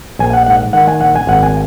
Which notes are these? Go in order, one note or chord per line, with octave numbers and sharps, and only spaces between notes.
A#1 G#5
F#5
G#2 F#5
D#3 F#5
G#5
A#1 F#5
G#5
G#1 F#5
G#5